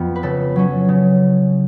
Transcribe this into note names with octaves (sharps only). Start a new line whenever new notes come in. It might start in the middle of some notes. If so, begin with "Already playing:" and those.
Already playing: F2 F3 B3
B4
C#3 A4
F#3 C#4
C#3